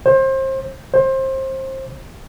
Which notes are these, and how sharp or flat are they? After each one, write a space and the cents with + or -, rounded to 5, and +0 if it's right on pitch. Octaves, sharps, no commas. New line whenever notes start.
C5 +30
C5 +25